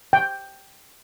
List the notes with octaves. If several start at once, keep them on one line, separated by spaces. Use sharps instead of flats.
G5